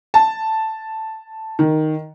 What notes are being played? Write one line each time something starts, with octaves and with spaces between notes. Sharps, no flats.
A5
D#3